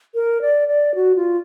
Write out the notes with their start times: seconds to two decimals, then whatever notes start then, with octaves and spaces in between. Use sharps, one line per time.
0.15 A#4
0.41 D5
0.68 D5
0.95 F#4
1.16 F4